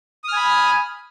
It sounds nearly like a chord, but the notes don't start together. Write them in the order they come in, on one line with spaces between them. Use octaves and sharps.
D#6 F6 G#5 B5